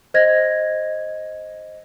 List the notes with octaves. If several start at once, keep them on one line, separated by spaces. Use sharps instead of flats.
C5 D#5 G#6 A#6